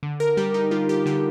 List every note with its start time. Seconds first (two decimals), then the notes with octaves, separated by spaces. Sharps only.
0.03 D3
0.20 A#4
0.37 G3 G4
0.54 D#4
0.71 G3 F4
0.89 G4
1.06 D3 G4